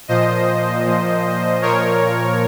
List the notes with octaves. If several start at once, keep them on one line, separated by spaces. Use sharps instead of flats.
A#2 F3 C5 D#5
A#2 F3
A#2 F3 A#4 C#5